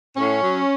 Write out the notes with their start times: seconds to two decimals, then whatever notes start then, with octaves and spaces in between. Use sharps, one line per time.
0.16 A2 C#4
0.41 F#3